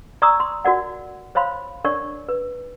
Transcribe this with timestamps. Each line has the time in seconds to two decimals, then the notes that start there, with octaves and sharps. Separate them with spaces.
0.22 D5 A#5 C#6 D#6 E6
0.40 C6
0.65 F#4 A#4 D5 F#5
1.35 C5 C#5 F5 B5 C6
1.84 D4 A#4 C#5 D5 C#6
2.29 B4